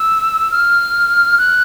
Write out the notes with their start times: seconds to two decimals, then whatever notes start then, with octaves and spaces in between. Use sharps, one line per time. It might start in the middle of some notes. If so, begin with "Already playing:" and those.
Already playing: E6
0.51 F6
1.38 F#6